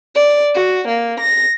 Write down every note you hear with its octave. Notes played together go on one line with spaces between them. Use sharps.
D5
F#4
A#3
A#6